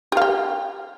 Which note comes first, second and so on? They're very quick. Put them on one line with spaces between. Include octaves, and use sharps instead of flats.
G4 F5 G5